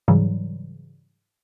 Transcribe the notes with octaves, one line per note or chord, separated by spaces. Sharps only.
G#2 C#3 E3 F#3 G3